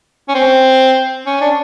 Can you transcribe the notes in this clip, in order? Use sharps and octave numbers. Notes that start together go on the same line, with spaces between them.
C#4
C4
C#4
D4